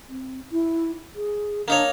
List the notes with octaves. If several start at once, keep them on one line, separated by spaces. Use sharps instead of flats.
C4
E4
G#4
A#3 D4 D#4 C#5